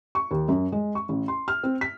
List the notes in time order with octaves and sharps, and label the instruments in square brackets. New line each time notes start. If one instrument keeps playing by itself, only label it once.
[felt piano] C#6
D#2
F#2
G#3
C#6
A1
C6
F6
C4
B6